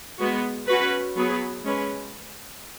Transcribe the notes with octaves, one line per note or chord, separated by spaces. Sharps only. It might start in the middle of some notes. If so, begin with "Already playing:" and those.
G#3 B3 F#4
C#4 F#4 B4
F#3 B3 G#4 B4
G#3 C#4 B4